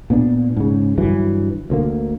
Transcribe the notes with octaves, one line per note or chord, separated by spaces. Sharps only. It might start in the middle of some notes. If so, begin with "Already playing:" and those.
A#2 B3 D4
G#2 C#3
G2 D3 E3 F#3
D2 D3 A#3